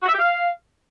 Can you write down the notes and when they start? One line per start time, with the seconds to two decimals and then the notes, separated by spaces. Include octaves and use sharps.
0.03 F#4
0.08 E5
0.13 G4
0.19 F5